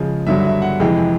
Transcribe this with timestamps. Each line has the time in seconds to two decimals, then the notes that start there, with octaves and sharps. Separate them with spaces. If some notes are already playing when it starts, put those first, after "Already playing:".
Already playing: C#3 F3 G#3
0.27 G2 D3 F#3 E5
0.45 E5
0.62 F#5
0.80 F2 C3 E3 G#3 G5